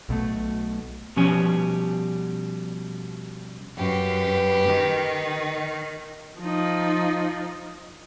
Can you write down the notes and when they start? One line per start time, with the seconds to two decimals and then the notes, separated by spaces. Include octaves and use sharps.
0.09 B1 B2 A3
1.16 B2 F3 G3 C#4 G4 G#5
3.77 F#2 G4 B4
4.67 D#3
6.40 F3 D#4